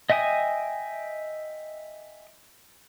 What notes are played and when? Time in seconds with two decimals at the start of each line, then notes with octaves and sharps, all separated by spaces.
0.10 D#5 E5 G5 G#5 D#6